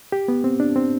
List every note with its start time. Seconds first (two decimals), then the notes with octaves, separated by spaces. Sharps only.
0.12 G4
0.28 B3
0.44 C4
0.60 D4
0.76 C4